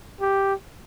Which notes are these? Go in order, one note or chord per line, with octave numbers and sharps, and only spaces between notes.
G4